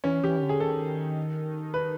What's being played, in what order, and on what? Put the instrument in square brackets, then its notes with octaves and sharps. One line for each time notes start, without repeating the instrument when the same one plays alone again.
[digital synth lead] E3 [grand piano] C#4
[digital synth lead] E3 [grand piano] G4
[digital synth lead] D#3
D3
[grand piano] G#4
[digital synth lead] D#3 [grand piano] A4
[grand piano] B4